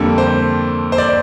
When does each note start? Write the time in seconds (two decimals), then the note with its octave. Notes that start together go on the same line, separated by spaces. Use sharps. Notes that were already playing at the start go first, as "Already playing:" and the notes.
Already playing: F2 D3 G3 A#3 A4
0.18 C5
0.92 C5
0.98 D5